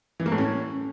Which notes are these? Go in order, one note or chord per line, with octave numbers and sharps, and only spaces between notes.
E3
A#3
A2
C#4